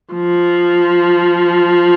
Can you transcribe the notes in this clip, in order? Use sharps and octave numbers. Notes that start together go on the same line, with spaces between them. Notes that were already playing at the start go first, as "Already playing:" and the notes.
F3